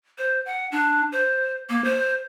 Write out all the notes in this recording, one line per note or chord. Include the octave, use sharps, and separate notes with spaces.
C5
F#5
D4
C5
A#3
C5